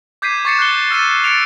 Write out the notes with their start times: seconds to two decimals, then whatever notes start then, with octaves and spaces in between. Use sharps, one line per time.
0.22 D6 G6 G#6 B6 C7 D#7
0.45 C#6 D6 A6 C7 C#7 E7
0.58 D6 F#6 G6 C7 C#7 G7
0.91 E6 F6 A6 C7 D#7 E7
1.24 A6 C#7 D7 F7